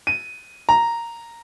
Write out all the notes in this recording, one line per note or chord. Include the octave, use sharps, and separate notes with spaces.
D#7
A#5